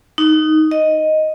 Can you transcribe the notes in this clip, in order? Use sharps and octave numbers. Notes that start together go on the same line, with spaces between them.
D#4
D#5